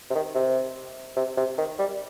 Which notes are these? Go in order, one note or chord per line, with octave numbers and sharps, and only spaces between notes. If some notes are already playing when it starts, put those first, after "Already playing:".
C3
D#3
C3
C3
C3
D#3
G3